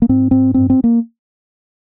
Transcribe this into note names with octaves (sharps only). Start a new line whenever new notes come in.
A#3
G#2 C4
G#2 C4
G2 C4
C4
A#3